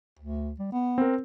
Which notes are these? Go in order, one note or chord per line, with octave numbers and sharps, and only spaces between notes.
D2
G3
B3
C4 A#4